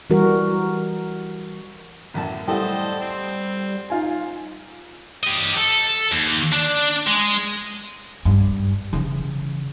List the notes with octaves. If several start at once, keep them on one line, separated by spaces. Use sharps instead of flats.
E3 G3 F#4 A#4
A1 F#2 A5
A2 G3 A3 A4 C5 D#5 F#5 G5
C4
D#4 F4 G#5
G4 D#5
A4
D#2
D4
G#3
G2
C#3 E3